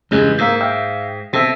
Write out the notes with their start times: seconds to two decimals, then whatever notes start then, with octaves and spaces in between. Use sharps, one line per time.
0.11 E2 G2 C#3 G#3
0.38 G#2 A#3 E6 G6
0.61 E5 F5 G5
1.33 B2 C4 A4 E5